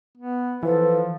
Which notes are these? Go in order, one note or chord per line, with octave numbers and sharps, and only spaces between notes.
B3
E3 F3 A4 B4